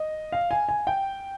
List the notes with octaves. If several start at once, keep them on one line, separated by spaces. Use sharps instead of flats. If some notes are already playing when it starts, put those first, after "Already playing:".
Already playing: D#5
F5
G#5
G#5
G5